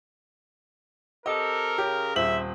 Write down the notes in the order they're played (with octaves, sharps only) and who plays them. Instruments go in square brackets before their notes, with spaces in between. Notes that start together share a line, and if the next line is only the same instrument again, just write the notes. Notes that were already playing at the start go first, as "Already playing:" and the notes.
[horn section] C4 G4 A4 [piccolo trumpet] A#4 [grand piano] D#5
[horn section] C#3 [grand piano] G4
[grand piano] D#1 C4 F#7 [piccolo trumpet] E5